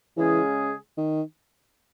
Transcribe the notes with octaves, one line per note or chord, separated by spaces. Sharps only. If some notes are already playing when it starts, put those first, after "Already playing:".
C#3 E3 G#3 C#4 G#4
D#3